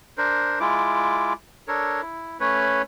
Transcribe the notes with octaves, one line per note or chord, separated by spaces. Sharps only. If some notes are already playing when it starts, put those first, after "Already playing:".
D4 A#4 C5
G#3 E4 F4 D6
D4 A4 A#4 C#5
E4
A3 C#4 B4 C#5